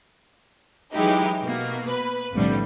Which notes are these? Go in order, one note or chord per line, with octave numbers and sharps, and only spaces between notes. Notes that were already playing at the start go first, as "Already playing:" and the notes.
E3 F#3 G#3 D#4 E4 G4
B2 A#3 B3
B4
B1 F2 A2 D3 G3